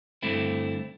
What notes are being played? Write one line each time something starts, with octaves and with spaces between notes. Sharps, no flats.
G2 D3 A3 C4 E4